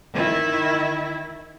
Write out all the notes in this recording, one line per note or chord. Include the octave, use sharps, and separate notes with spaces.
D#3 E4